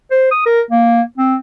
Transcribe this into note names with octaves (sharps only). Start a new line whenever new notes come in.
C5
D#6
A#4
A#3
C4